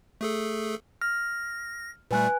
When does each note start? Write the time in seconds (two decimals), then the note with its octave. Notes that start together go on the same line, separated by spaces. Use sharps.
0.21 A3 G#4 A4
1.01 F6 A#6
2.11 A#2 G3 A3 B4 G#5 F#6